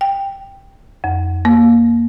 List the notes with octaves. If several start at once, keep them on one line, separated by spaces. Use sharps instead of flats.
G5
F2
A#3